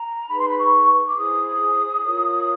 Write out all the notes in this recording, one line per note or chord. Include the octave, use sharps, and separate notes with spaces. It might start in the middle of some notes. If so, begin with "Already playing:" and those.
Already playing: A#5
D#4 G#4 B4 B5
C6
B5
C#6
D6
E4 G#4 C5 D#6
F4 A#4 C#5